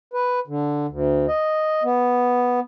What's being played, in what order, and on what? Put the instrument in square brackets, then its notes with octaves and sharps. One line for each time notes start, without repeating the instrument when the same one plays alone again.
[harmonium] B4
D3
D2
D#5
B3